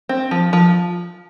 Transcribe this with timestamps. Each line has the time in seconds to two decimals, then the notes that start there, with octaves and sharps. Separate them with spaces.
0.09 C4
0.31 F3
0.53 F3